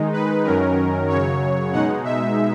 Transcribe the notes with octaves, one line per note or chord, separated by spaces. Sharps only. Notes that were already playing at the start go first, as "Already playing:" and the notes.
Already playing: D#3 G#3 D#4
B4
F#2 D#3 F#3 C#4 A#4
F#2 C#3 F#3 C#5
B2 G#3 D#4 F#5
E5